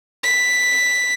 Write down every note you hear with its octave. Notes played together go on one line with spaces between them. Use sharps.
B6